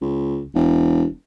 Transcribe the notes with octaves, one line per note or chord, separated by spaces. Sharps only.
C#2
E1